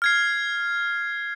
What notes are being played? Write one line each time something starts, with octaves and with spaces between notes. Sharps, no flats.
F6 G#6 C7